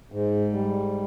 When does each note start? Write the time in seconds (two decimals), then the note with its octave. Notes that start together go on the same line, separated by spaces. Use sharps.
0.12 G#2
0.53 G3